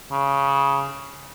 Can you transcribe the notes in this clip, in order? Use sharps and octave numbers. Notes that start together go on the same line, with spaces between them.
C#3